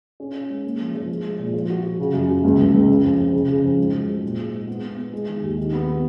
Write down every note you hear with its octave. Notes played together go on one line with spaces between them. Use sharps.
C#4
C#4
G#3
A#3
F3
F3
G#4
G#3
A#2
F3
F#4
F#4
C#3
F#2
F#2
C#2
C#2
C#2
C#3
F2
F2
C#3
C#3
F2
G#2
F#3
G#2
A#2
G#3
G#3
B3
B3
B3
G#3
D#3
D#2
D#3
B3
B3